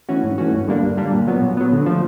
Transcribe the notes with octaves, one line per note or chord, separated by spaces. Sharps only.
E3 A3 C#4 F#4
G#2
E3 A3 C#4 F#4
G2
D3 G3 A#3 D4
G2
D3 G3 A#3 D4
A#2
F#3 B3
A#2
F#3 B3
D3
F3 A3